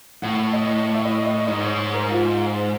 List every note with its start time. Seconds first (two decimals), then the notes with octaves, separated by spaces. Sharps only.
0.22 A2 F#5
0.53 D#5
0.94 E5
1.05 D#5
1.26 D#5
1.47 G#2 D#5
1.63 C#5
1.94 A#4
2.09 F4